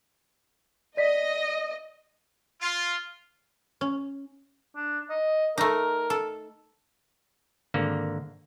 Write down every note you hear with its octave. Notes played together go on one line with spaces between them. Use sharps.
D5 D#5 B6
F4
C#4
D4
D#5
A3 D#4 A#4
A4
G#1 D3 A#3